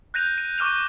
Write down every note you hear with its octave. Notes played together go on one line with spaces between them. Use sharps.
F#6 G6 A#6 D#7 F7
D#7
C#6 D6 F6 D#7 F7